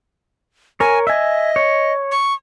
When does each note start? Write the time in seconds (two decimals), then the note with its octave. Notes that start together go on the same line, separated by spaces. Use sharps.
0.80 A#4 C#5 G#5
1.07 D#5 E5 G#5
1.56 C#5
2.11 C#6